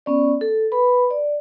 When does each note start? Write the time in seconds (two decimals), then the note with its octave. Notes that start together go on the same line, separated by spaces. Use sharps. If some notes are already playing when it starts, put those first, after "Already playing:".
0.06 B3 C#4 D5
0.41 A4
0.72 B4 B5
1.10 D5